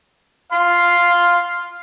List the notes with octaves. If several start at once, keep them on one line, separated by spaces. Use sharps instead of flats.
F5 C6